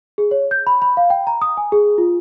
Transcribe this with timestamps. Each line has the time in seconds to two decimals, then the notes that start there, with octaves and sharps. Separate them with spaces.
0.18 G#4
0.31 C#5
0.51 G6
0.67 B5
0.82 B5
0.97 F5
1.10 G5
1.27 A#5
1.42 D#6
1.57 G#5
1.72 G#4
1.98 F4